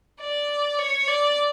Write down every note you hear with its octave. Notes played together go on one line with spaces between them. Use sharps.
D5
C#5
D5